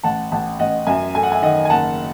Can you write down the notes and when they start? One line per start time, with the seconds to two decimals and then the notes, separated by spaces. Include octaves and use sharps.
0.03 A1 F#5 A5
0.32 A1 F#5 A5
0.59 A1 D#5 F#5
0.87 F#2 E5 G#5
1.15 A3 G#5
1.23 F#5
1.32 E5 G#5
1.42 D#3 D#5 F#5
1.65 G#5
1.70 F#1 F#5 A5